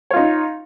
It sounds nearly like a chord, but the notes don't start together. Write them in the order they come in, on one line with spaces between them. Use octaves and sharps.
C#5 F4 D#4